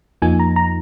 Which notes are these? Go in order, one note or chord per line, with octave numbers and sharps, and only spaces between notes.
F2 F3 A#3 D#4 G#5
A#5
A#5